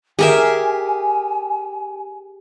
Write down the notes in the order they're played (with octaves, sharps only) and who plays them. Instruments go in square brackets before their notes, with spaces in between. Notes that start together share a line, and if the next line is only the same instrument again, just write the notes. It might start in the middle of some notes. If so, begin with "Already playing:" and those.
[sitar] G4 [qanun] G#4 A#4 E5 [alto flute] G#5